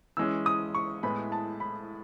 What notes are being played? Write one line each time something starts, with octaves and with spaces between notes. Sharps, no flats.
E3 G#3 C#4 E6
D#6
C#6
A2 G#3 B3 E4 B5
A5
B5